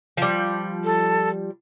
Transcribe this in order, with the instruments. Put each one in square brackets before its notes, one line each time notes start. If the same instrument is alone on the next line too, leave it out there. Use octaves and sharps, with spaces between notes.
[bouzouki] F3 G3
[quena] A4